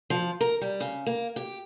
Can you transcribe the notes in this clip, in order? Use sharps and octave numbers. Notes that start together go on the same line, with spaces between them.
F3
A#4
G3
C#3
A#3
G4